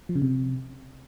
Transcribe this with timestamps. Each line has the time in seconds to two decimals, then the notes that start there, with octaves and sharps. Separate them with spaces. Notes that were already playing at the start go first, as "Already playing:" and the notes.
0.09 F3
0.16 C#3
0.22 C3